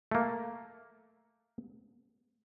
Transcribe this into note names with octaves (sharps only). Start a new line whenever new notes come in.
A3 A#3